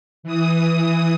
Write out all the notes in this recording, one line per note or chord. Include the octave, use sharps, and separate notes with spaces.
E3 D#6